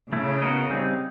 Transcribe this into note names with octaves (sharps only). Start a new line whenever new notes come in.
C#3 A3 C#4 E4
B3 D#4 F#4 A#4 D#5
G3 C4 D#4 G#4